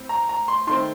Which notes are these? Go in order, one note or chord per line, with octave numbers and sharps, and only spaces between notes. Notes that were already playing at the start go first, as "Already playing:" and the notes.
Already playing: A2 C4
A#5
A#5
C6
D#3 A3 C4 C6